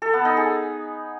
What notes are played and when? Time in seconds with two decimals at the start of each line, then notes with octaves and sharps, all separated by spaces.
0.02 A4
0.13 B3
0.25 D#4
0.37 G#4